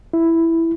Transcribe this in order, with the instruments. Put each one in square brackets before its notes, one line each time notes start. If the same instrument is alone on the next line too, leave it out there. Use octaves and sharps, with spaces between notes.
[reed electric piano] E4